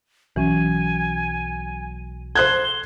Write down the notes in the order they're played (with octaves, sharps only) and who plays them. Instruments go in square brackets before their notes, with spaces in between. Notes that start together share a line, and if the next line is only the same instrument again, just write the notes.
[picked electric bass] B1 F#3 [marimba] E3 C#4 [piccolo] G#5
[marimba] A4 [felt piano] C5 F#6 G#6 [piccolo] G7